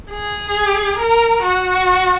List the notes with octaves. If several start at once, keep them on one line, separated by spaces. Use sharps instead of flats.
G#4
A#4
F#4